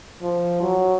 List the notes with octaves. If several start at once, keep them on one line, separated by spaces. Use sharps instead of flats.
F3
F#3